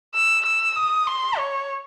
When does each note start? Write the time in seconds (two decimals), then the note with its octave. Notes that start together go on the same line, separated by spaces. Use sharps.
0.15 E6
0.45 E6
0.76 D#6
1.07 C6
1.38 C#5